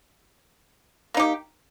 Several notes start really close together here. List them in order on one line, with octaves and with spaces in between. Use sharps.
A#3 D#4 G4